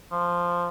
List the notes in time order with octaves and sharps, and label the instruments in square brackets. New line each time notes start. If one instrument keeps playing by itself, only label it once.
[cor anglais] F3